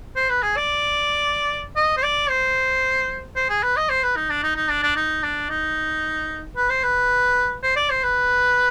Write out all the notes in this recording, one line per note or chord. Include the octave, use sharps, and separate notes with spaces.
C5
B4
G#4
D5
D#5
C5
D5
C5
C5
G#4
B4
D#5
C5
B4
D#4
D4
D#4
D#4
D4
D4
D#4
D4
D#4
B4
C5
B4
C5
D5
C5
B4